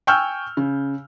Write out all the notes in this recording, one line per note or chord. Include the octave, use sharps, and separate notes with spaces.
G5 G#5 C#6 E6 F6 G6
C#3